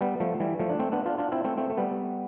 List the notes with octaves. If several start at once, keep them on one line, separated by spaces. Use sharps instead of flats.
G3 B3
F3 A3
E3 G3
F3 A3
D4
A3 C4
B3 D4
D4 F4
D4 F4
C4 E4
A3 C4
A3 C4
A3
G3 B3